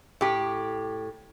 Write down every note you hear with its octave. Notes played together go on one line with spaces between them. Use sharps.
A2 G4